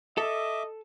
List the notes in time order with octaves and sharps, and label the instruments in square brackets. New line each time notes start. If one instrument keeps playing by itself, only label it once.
[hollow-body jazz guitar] A4 [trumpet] D#5 [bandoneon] E5 D6